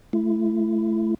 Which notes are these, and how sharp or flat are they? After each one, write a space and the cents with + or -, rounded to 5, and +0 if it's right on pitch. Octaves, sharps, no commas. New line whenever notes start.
A3 -20 E4 +30